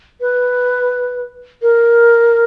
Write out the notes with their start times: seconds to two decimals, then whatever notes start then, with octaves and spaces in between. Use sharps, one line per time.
0.21 B4
1.62 A#4